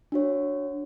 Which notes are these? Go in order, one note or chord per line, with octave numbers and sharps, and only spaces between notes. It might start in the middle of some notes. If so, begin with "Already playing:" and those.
D4 F#4 C#5